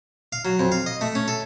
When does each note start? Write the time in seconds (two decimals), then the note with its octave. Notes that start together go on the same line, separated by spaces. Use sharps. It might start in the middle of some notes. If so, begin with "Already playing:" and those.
0.32 F5
0.45 F#3
0.60 F2
0.72 F5
0.86 D#5
1.01 A3
1.15 C#4
1.28 A4